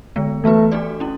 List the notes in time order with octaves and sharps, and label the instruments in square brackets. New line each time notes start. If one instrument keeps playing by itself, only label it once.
[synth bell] D3 G#3 B3
[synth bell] E3 B3 F#4 B4 [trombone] A3
[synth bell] A3 D4 F#4 A4 D5
C#4 E4